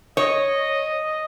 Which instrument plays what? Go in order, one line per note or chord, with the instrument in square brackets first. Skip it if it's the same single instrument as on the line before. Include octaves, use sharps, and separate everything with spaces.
[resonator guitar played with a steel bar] C#5 [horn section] D#5